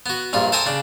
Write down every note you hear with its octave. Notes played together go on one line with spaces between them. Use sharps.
B3 F#4
A#1 G2 F4
A4 C5 G5 G#5 A#5 D#6
C#3 D4